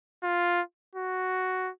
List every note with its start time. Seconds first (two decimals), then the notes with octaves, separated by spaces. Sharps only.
0.23 F4
0.95 F#4